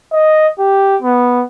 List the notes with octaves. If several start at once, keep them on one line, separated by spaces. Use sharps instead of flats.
D#5
G4
B3